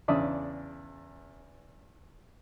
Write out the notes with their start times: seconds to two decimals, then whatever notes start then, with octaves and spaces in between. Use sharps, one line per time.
0.08 E2 C#3 D4 D5 E5 D#6